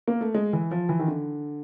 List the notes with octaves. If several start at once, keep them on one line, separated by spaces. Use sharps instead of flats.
A#3
A3
G#3
E3
F3
E3
D#3
D3